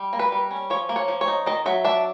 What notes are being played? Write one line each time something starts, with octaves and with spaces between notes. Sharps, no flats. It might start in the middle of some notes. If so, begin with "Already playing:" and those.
Already playing: G3
A#3
B4
G3
C#4
F3 C#5
A#3
C#5
F3
C#5
D#4
D#3 D#5
F#3 E5
D4 E5